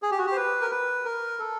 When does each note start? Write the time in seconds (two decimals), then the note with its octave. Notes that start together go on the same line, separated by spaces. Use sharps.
0.02 G#4
0.11 G4
0.18 F#4
0.26 G4
0.32 C5
0.36 B4
0.61 A#4
0.71 B4
1.05 A#4
1.39 A4